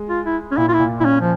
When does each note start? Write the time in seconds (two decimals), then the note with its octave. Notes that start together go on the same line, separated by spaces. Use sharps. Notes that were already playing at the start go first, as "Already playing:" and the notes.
Already playing: G#3
0.09 F4
0.25 E4
0.52 C#4
0.57 A#2 E4
0.68 F4
0.73 E4
0.79 A#2
1.00 A#2 C#4 E4
1.21 F3